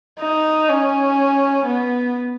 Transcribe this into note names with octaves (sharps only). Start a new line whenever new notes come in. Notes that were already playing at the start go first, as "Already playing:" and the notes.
D#4
C#4
B3